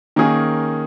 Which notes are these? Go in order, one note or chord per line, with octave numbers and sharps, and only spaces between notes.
D#3 A#3 C#4 G#4